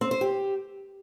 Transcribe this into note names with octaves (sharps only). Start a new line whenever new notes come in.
C4
C5
G4